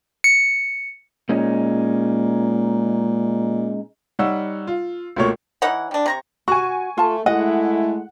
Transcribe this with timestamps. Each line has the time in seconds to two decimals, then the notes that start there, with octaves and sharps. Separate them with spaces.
0.24 C#7
1.29 A#2 G#3 C#4 D#4
4.19 G3 D#4 C#5 F#5 E6
4.67 F4
5.16 C#2 B2 A3 A#3 F4 C#5
5.62 E3 D#4 C#5 F#5
5.91 G3 D4
6.06 C3 A#5 C#6
6.48 F#4 G#5 C#6
6.98 A3 F4 A5
7.26 G#3 A3 E4 D#5 F#5